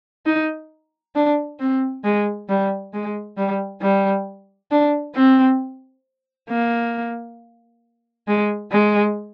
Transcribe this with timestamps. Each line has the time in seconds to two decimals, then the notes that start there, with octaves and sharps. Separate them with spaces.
0.26 D#4
1.16 D4
1.60 C4
2.04 G#3
2.49 G3
2.94 G#3
3.38 G3
3.82 G3
4.71 D4
5.15 C4
6.49 A#3
8.28 G#3
8.72 G#3